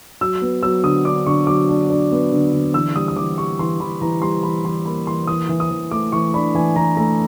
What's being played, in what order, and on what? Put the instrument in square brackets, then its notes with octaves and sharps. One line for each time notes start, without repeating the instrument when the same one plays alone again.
[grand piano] F#3 E6
B3
F#3 E6
D3 D#6
D4 D6
D3 C#6
F#3 D6
D4
D4
B3
D3
D3
E3 E6
G3 D#6
D#6
E3 D6
G3 C#6
E3 C6
E3 B5
E3 A#5
G3 C6
E3 B5
E3 C6
A#3 B5
E3 C6
E3 D#6
E3
D#6
E3
A3 D6
E3 C#6
D4 B5
E3 G#5
E3 A#5
A3 A#5